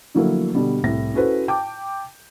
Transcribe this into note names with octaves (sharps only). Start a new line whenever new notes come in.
D3 F3 F#3 A3 A#3 E4
B2 D3 G3
C2 A2 A#6
C#4 E4 F#4 A4 B4 C5
G5 A5 D6 G6